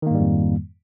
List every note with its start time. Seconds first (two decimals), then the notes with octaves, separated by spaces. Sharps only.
0.02 D#3
0.07 A#3
0.11 G#2
0.15 G3
0.19 F2